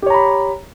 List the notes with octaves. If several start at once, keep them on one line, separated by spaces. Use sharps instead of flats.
G4 C#5 A#5 B5